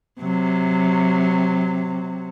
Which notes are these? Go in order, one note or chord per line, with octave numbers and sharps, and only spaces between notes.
C3 F#3